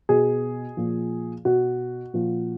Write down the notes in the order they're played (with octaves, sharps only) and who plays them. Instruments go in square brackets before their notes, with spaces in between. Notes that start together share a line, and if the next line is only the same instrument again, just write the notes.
[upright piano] B2 G#4
A#2 F3
B2 F#4
A#2 F3